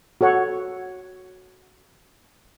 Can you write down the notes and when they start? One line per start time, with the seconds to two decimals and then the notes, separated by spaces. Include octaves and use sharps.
0.21 F#4 A4 C#5 F#5